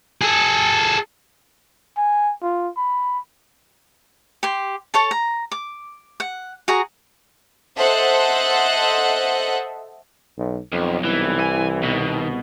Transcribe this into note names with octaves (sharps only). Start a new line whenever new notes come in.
G#4 A4
G#5
F4
B5
G4 C6
A4 C#5 A5
A#5
D6
F#5
F#4 G#4 A#5
A4 C5 D#5 E5 F#5 F#6
B1
B1 F2
C2 E3
G#5
B2 D#3